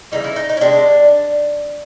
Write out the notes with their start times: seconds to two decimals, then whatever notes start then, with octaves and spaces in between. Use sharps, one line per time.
0.12 C#3 E3 G3 D#4
0.24 E4
0.36 D#4
0.49 D#4
0.57 C#4
0.61 C3 F3 G#3 D4